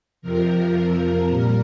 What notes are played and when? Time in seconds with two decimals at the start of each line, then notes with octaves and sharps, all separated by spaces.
0.22 F2 C3 F3 A#4
0.75 A#4
1.29 A#2 G3